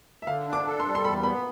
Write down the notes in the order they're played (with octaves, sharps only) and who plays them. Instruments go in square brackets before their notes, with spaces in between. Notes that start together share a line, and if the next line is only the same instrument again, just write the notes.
[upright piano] E5
[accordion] D3 [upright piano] F5
[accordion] D4
[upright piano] D6
[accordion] A4
[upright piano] C6
[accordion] G3
[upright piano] C6
[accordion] E2 [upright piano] B5
[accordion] B3 [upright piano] B5